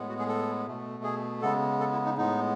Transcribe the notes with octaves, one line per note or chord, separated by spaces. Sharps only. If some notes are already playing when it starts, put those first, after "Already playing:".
Already playing: A2 G#3 B3
F#4
G#4
A4
B2 A3
G#4
C#3 G#3 B3 A4
A4
E4
D#4
A2 G#3 B3 D#4